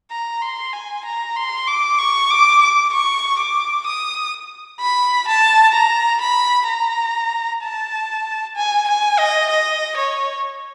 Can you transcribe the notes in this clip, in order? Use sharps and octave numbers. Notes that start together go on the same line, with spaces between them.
A#5
C6
G#5
A#5
C6
D6
C#6
D6
D6
C#6
D6
D#6
B5
A5
A#5
B5
A#5
A5
G#5
G#5
D#5
D#5
C#5